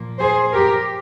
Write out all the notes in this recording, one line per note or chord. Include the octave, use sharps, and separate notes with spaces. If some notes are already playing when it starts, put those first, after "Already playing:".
Already playing: A#2 F3 A#3
G#4 C5
G4 A#4